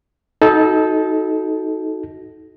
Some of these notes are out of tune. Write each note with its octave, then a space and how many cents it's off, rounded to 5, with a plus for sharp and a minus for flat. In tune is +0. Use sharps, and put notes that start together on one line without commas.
D#4 +20 F#4 +0 A4 -15